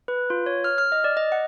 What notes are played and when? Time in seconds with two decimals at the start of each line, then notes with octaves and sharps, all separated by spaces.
0.08 B4
0.30 F4
0.46 C#5
0.64 F6
0.78 F6
0.92 D#5
1.04 D5
1.17 D#5
1.32 F#5